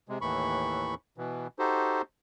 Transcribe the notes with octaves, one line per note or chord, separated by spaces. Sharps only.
C3 G#3
D#2 A2 E3 B5 C#6
B2 E3
D#4 F#4 G4 A4 C5